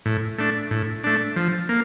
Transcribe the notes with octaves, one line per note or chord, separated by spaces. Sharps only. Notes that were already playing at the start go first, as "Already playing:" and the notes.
A2
A3 D4
A2
A3 D4
F3
A#3